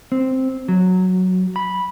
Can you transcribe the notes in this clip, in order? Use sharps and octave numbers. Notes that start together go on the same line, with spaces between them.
C4
F#3
B5